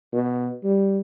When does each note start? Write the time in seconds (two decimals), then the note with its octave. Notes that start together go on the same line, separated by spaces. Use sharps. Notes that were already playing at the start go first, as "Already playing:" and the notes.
0.13 B2
0.64 G3